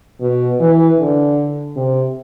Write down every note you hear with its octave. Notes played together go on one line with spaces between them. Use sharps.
B2
E3
D3
C3